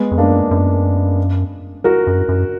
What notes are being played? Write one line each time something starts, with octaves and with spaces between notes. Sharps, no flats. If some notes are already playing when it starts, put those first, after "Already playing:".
Already playing: G#3 B3
F2
F#2 A#3 D4
F#2
F#4 A#4
F#2
F#2